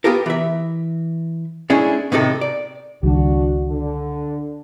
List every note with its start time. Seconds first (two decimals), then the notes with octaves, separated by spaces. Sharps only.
0.04 B3 F4 G4 A4 A#4
0.26 E3 E5
1.70 G#3 A3 C#4 D4 E4 G#4
2.12 A2 C3 D#3 D#4 E4 A4
2.41 D5
3.03 C#2 D#3 G3 D4 F#4
3.69 D3